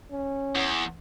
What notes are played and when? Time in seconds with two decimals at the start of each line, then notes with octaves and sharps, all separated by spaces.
0.12 C#4
0.55 E2